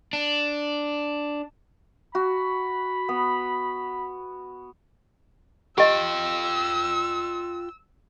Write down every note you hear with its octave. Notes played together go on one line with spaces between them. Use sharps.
D4
F#4 B5
B3
F4 G4 D#5 G5 E6